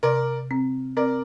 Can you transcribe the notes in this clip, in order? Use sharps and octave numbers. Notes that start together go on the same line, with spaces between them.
C3 A#4 D5
C4
C4 A#4 D5